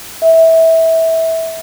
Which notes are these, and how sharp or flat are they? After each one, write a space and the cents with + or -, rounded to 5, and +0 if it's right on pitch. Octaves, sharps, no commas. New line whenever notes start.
E5 -20